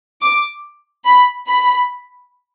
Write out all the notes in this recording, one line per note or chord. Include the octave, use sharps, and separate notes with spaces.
D6
B5
B5